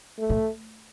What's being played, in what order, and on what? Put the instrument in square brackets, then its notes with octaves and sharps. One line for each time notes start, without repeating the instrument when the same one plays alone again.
[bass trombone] A3
[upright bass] A2